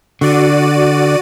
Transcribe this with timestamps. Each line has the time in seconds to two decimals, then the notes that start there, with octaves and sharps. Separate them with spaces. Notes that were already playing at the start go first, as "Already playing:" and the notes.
0.21 D3 F#4 D5 D#7